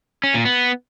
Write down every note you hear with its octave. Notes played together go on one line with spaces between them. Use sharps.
C#4
A#2
B3